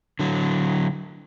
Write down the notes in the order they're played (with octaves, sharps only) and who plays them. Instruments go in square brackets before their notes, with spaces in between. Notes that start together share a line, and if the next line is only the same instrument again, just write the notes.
[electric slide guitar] D3 F#3